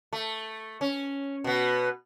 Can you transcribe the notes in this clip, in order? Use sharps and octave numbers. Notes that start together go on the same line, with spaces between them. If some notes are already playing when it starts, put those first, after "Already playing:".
A3
C#4
B2 B3